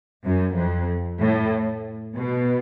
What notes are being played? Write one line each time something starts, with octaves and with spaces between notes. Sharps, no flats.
F#2
F2
A2
B2